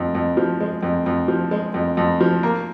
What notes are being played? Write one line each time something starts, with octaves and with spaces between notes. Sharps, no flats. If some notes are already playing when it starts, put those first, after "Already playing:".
Already playing: F2
F2
F3
G#3
F2
F2
F3
G#3
F2
F2
F3
A#3